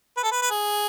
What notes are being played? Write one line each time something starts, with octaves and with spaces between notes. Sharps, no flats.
B4
A4
B4
B4
G#4